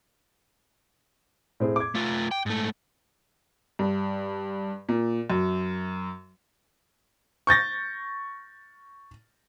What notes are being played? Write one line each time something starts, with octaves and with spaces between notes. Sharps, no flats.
A2 C4 G#4
D6 G#6
A3 F4
G5
G#2 A3
G2
A#2
F#2
C#6 G6 A6 A#6